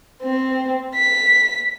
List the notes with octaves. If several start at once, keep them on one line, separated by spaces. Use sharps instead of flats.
C4
B6